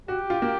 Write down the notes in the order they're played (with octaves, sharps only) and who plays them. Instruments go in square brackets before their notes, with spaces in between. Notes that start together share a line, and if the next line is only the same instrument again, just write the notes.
[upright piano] F#4 [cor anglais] G4
[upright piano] F4
A#3